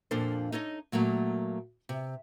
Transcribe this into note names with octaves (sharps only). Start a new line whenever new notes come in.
F2 A#2 F3 D4 A4 C5
D#4 A4 C#5 D#5
A#2 F#3 A3 A#3
C3